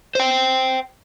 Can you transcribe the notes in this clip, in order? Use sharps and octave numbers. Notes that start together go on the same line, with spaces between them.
C5 G5